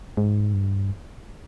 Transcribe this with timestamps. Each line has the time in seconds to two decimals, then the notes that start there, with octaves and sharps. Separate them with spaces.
0.17 G#2
0.53 G2